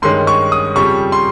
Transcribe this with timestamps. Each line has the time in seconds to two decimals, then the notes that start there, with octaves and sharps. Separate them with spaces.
0.02 G2 D#3 G#3 C#4 C6
0.27 C#6
0.52 D#6
0.75 F2 C#3 G3 C#6
1.12 C6